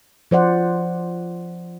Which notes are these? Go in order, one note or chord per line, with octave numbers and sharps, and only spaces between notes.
F3 C5 D5 F#5